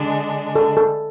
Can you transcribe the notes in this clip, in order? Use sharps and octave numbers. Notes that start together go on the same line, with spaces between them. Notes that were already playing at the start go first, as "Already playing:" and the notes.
Already playing: D3 G#3 D4
A4
A4